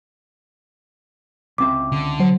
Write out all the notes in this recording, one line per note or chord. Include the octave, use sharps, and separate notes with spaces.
C#2 C4 E5 D6
D3
F#3 C5